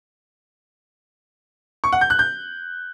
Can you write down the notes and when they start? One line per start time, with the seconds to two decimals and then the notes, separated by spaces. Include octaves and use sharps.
1.84 C#6
1.92 F#5
2.01 G6
2.10 F#6
2.19 G6